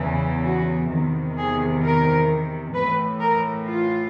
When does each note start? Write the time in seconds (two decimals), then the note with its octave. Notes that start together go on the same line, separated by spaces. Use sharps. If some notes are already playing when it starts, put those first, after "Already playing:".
Already playing: E2 C#3 E3
0.45 F#4
0.91 E2 C3 D#3
1.37 G#4
1.83 A#4
2.74 A2 E3 B4
3.20 A#4
3.66 F4